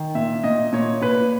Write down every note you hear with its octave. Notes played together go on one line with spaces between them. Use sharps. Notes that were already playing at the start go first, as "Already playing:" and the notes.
Already playing: D#3
A#2 E5
A#2 D#5
A#2 C#5
A#2 B4